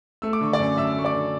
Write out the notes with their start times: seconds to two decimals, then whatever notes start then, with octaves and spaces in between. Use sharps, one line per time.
0.22 A3 E6
0.33 D6
0.41 D3 C#6
0.53 D5 D6
0.59 F#2
0.77 F#2 E5 E6
0.97 A3 C#6
1.05 D5 D6
1.14 D3